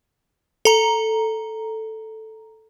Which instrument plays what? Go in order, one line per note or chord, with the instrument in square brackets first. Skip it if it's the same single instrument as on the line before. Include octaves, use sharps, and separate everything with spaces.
[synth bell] A4 A#5